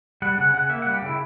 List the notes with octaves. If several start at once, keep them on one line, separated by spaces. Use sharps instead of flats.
G3 F#5
C#3 F#5
C#3 F#5
A#3 E5
F#5
G3
G4
C#3 E4